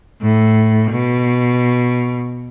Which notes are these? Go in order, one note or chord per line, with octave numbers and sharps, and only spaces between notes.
A2
B2